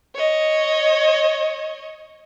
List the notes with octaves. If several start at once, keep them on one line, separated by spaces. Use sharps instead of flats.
C#5 D#5